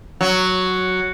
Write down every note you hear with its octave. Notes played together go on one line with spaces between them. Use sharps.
F#3